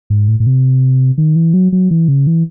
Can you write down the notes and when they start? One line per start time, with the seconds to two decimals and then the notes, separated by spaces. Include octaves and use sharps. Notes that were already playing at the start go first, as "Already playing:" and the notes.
0.10 G#2
0.28 A2
0.40 A2
0.46 C3
1.18 D#3
1.36 E3
1.54 F#3
1.72 F#3
1.91 E3
2.08 C#3
2.27 E3